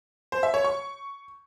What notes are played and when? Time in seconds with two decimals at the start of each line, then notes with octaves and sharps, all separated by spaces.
0.32 C5
0.43 E5
0.54 C#5
0.65 C#6